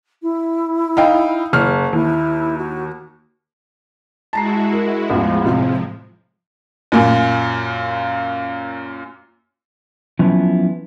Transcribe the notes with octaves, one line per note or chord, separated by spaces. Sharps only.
E4
D#4 F5 G5
F#1 F6
D#2 E4
F#4
G#3 E4 F#4 A5 A#5 C7
A#4
A1 E2 F3 G#3 F4
A2 C3 F3 G#3 F4
F#2 A#2
F3 F#3 B3 C#4 E4 F4